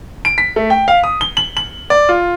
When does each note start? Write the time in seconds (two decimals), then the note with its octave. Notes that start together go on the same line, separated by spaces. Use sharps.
0.25 D7
0.38 B6
0.56 A3
0.70 G5
0.88 F5
1.04 D#6
1.21 G7
1.37 F#7
1.57 F#7
1.90 D5
2.09 F4